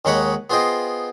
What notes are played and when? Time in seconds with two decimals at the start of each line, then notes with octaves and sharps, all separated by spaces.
0.05 D#2 G#3 D#4 C#5 F#5 B5
0.50 B3 F4 G#4 C5 D#5 G5